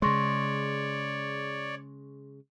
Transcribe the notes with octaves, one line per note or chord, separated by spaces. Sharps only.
C#3 G#3 C#5 D5 C6 C#6 A#6